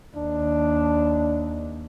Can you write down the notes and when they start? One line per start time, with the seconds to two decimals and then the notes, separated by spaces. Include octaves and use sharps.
0.16 D#2 D4